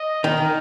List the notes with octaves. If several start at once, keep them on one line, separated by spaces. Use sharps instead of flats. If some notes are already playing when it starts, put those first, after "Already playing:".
Already playing: D#5
D#3 A#4